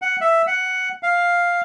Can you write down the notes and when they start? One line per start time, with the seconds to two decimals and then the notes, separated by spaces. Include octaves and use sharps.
0.02 F#5
0.21 E5
0.47 F#5
1.03 F5